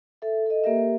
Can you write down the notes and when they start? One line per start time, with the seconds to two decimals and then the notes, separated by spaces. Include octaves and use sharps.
0.22 A4 E5
0.46 A4 D#5
0.64 A#3 G4 A#4 E5